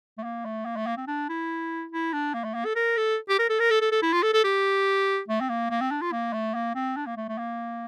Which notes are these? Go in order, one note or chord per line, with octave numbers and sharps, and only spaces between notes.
A3
A#3
A3
A#3
A3
A#3
C4
D4
E4
E4
D4
A#3
A3
A#3
A4
A#4
A4
G4
A#4
A4
A#4
A4
A4
A4
E4
F4
A4
A4
G4
A3
C4
A#3
A#3
C4
D4
F4
A#3
A3
A#3
C4
D4
A#3
A3
A3
A#3